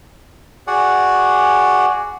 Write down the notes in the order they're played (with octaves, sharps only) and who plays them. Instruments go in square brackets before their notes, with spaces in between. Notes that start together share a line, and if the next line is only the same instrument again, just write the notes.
[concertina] F#4 G#4 D5 F#5